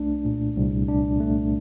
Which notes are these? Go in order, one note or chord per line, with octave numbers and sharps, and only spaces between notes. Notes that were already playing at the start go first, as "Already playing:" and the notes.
Already playing: C2 A3 D4
A#2
C2
D4
A3